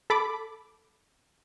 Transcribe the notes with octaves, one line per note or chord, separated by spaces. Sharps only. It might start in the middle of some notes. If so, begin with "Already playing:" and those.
A4 B5 D6